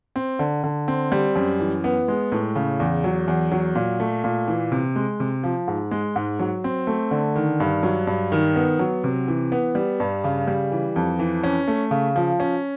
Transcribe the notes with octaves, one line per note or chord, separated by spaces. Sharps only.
C4
D3
D3
C4
G3
F#2
E3
B3
G#3
A2
C#3
E2
F#3
E2
F#3
A#2
A3
A#2
E3
C3
G#3
C3
F3
G#2
G#3
G#2
F#3
C4
A3
D3
D#3
G2
F#3
G2
D#3
B3
F#3
C3
E3
B3
G3
G2
C#3
G3
E3
F2
E3
C#4
A3
C#3
F3
C#4